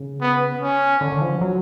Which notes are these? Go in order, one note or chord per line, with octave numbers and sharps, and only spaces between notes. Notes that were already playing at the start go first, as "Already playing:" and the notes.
Already playing: C#3
B3
C#4
D3
D3
F3
F#3